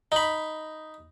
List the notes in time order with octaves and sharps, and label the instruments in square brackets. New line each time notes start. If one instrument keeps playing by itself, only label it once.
[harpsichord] D#4 B5